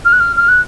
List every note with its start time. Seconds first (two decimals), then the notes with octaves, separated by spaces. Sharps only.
0.05 F6
0.13 F#6
0.20 F6
0.36 F6
0.48 F#6